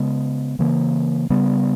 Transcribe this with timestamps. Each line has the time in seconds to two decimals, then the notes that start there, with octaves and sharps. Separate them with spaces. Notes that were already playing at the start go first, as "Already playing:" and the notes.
Already playing: C#3 G#3 B3
0.59 C#3 E3 A#3
1.30 C#3 G3 B3